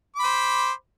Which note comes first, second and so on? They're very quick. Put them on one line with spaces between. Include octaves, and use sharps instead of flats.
D6 B5 C5